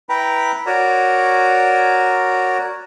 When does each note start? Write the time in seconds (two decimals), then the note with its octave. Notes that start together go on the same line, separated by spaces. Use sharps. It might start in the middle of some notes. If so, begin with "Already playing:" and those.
0.09 E4 B4 G5 A#5 B5
0.66 F#4 A#4 C#5 D5